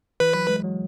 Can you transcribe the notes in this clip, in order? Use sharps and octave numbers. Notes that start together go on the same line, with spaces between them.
E3 B4
F#3
G#3
F#3